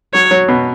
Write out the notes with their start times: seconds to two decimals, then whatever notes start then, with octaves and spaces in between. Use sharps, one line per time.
0.14 F#3 C#5
0.31 F#3
0.48 B2